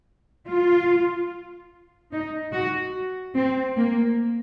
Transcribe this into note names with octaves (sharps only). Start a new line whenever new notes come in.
F4
D#4
F#4
C4
A#3